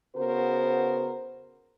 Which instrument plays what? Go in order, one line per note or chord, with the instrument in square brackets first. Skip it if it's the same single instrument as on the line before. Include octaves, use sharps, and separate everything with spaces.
[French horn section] C#3 B3 F#4 A#4 C5